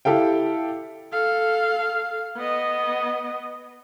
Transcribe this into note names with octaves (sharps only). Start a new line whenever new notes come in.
E4 G4 A4 F5 G5
A4 F5
B3 D#5